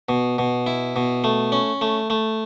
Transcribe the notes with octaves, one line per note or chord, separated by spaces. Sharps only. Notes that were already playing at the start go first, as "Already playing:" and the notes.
B2
B2
E4
B2
A3
C#4
A3
A3